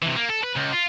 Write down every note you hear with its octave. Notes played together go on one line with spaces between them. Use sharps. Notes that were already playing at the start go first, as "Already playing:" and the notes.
C3 E3
A#3
A4
B4
C#2
F4